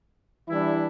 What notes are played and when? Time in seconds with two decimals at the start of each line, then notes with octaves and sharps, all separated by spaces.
0.49 E3 G3 D4 E4